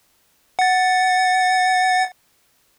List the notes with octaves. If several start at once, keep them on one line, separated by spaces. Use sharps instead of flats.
F#5 A6